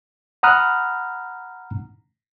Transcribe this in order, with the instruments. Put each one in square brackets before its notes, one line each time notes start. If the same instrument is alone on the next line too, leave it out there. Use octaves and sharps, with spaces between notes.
[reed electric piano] F#5 A#5 B5 D#6 F6 F#6